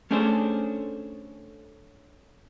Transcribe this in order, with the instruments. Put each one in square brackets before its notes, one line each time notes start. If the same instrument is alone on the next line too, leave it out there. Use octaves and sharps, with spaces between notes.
[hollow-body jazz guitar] A3 C#4 D4 G#4 A4 C5